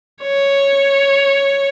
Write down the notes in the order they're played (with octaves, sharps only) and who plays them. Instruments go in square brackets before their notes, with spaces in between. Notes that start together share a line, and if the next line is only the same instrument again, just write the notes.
[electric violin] C#5